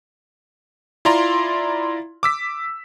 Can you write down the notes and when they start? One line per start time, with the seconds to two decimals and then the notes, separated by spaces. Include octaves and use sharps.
1.05 E4 F4 D5 A#5 C6
2.23 D6 E6 B6